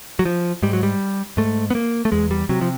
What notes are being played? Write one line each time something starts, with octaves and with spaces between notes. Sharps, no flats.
F#3
F3
G#2 G3
F#3
G3
G#2 A3
B3
A#3
A3
E2 G#3
G3
C3 F#3
F3